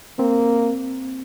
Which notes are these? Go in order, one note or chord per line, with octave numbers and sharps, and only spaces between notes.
A#3 C4